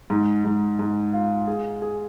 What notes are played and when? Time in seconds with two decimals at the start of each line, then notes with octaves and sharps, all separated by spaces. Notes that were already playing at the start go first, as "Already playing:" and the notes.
0.10 G#2
0.44 G#2
0.79 G#2
1.13 F4
1.47 G#4
1.82 G#4